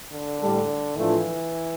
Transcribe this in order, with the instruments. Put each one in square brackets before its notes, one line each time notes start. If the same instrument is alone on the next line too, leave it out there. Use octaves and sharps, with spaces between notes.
[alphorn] D3
[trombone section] A2 G3 D4 A4
[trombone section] A2 F3 A3 D4 F4 [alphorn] E3